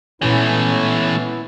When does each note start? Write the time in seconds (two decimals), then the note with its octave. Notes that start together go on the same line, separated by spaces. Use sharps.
0.22 A#2 E3 G#3 A3 B3 C#4 E4